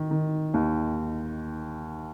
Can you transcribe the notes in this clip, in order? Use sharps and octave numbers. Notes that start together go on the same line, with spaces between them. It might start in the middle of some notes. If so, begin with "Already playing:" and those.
Already playing: D#3
D#3
D#2